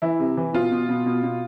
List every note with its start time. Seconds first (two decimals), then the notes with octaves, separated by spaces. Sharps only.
0.02 E3 E4
0.19 C3
0.37 E3
0.53 B2 F4
0.71 B2
0.89 B2
1.06 B2
1.23 B2